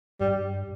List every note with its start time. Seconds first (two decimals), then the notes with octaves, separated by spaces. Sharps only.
0.20 G2 G3